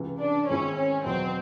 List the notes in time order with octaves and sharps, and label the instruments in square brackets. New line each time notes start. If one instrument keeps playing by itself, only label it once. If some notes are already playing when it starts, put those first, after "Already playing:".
Already playing: [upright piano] C#2 C3 E3
[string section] D4
[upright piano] G#2 D#3 G#3 C4 E4 [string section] C#4
[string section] C#4
[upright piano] E2 B2 F#3 [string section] C4